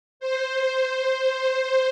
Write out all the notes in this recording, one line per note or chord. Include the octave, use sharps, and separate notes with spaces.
C5